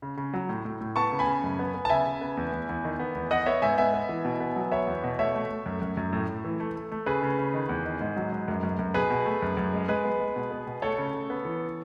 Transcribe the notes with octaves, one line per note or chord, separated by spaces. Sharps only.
C#3
C#3
F#3
A2
A2
A2
B3 A5 C#6
C#3
G#5 B5
C#3
F#2
B3
B3
A5
C#3 E5 G#5
C#3
B3
E2
E2
E2
D#3
B3
E2
B3 D#5 F#5
B3 C#5 E5
G#2 E5 G#5
B3 E5 G#5
B3
E3
B2
B3
F#3
B3 C#5 E5
E2
B2
A3 C#5 E5
A3
A3
F#2
F#2
F#2
A2
A2
E3
A3
A3
A3
C#3 G#4 B4
C#3
C#3
D#3
E2
D#3
G#2
F#3
G#2
F#2
F#2
F#2
B2 G#4 B4
B2
A3
F#2
F#2
G#3
G#3 G#4 B4
B3
G#3
B2
B3
B2
A3 A4 C#5
C#3
C#3
B3
E3